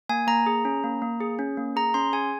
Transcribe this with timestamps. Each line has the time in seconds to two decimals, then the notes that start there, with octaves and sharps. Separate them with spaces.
0.09 A#3 G#5
0.27 A#3 A#5
0.46 G#4
0.65 C#4
0.84 A#3
1.02 A#3
1.21 G#4
1.39 C#4
1.57 A#3
1.76 G#4 A#5
1.94 C#4 C6
2.13 G#4 G#5